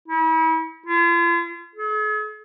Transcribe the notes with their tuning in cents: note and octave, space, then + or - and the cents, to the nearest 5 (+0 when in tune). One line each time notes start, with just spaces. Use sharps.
E4 -40
F4 -40
G#4 +45